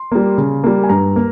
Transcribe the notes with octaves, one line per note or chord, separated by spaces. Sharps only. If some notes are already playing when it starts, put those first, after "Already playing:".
Already playing: C6
G3 A#3
C#3
G3 A#3
G#5
G2 A#5
A#3